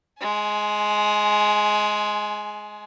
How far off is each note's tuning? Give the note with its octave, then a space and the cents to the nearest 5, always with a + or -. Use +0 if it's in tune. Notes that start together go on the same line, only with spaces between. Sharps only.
G#3 +10 G#5 +35